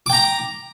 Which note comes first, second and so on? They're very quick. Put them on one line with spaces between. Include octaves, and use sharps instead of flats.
D6 G5 A#5